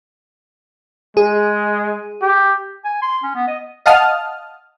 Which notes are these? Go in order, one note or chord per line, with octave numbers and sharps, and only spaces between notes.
G#3 G#4
G4
G#5
C6
C#4
B3
D#5
D#5 F5 F#5 A5 D#6 F6